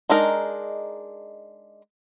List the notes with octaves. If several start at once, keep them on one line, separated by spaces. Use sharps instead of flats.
G#3 D4 D#4 A#4